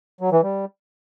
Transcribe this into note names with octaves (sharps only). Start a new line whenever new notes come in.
F#3
E3
G3